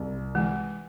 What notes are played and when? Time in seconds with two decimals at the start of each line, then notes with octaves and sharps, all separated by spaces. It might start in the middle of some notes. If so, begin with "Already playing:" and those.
Already playing: C2
0.35 E3 G#3